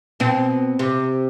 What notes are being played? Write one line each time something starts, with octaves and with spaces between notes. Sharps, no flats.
B2 C4
C3